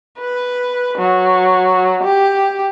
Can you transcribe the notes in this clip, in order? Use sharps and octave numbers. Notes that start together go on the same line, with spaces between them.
B4
F#3
G4